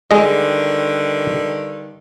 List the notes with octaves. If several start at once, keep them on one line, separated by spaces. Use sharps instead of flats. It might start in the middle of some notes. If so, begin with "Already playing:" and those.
G2 D3 D#3 G#3 D#5